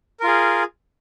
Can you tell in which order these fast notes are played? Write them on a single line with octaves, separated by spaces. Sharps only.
A#4 F4 G#4